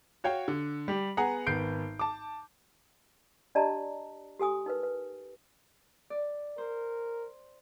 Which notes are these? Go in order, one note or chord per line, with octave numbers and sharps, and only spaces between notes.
F#4 C#5 F5 G5
D3
G3 G4
B3 G#4 F#5 A#5
G#1 B3 G6 C7 D7
A5 D6
D4 G4 D5 D#5 A5 A#5
G4 A4 G#5 D#6
D#4 A#4 B4
B4
D5
A#4 C5